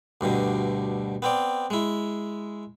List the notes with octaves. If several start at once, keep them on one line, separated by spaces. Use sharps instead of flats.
D2 G2 B2 D3
B3 C4 D5
G#3 E4